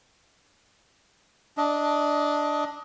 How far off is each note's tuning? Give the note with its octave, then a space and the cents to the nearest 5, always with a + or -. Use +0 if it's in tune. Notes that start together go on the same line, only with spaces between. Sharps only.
D4 +0 D#5 +20